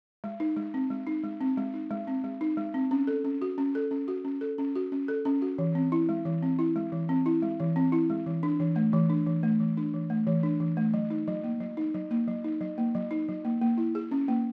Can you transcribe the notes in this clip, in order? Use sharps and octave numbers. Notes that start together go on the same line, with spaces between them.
G#3
D#4
G#3
C4
G#3
D#4
G#3
C4
G#3
D#4
G#3
C4
G#3
D#4
G#3
C4
C#4
A4
C#4
F#4
C#4
A4
C#4
F#4
C#4
A4
C#4
F#4
C#4
A4
C#4
F#4
E3
C4
E4
G#3
E3
C4
E4
G#3
E3
C4
E4
G#3
E3
C4
E4
G#3
E3
D4
E3
A3
E3
D4
E3
A3
E3
D4
E3
A3
E3
D4
E3
A3
F#3
D#4
F#3
A#3
F#3
D#4
F#3
A#3
F#3
D#4
F#3
A#3
F#3
D#4
F#3
A#3
A#3
E4
G#4
C#4
A#3